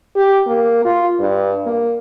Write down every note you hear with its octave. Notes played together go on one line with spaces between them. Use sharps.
G4
A#3
F4
G2
A#3